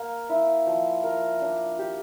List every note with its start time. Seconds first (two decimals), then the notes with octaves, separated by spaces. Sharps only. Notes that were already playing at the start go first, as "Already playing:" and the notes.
Already playing: A#3
0.29 E4
0.67 F3
1.03 A#4
1.41 D4
1.79 G4